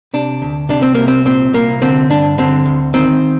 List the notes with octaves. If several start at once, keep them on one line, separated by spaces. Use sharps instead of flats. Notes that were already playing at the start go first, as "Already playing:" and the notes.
C3 D4
D2
C3 D4
C4
C2 A#3
C4
A#2 C4
C2 A#3
D3 C4
G2 D4
D3 C4
D2
D#3 C4